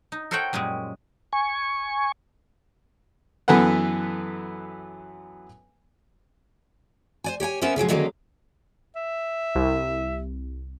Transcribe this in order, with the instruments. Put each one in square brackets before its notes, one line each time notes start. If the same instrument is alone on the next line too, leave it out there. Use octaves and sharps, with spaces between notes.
[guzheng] D#4
A4 A#4 C5 C#5 F#5 G5
F#2 A#2 G3 G#3
[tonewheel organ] G#5 C#6
[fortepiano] F#2 E3 B3 A4 B4 F#5
[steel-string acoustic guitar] C5 D5 G#5
G4 C#5 G5 G#5
B3 C#4 A#4 C5 E5
C#3 F3 F#3 G#3
D3 D#3 F#3 G#3 A#3 C#4
[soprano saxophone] E5
[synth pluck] C2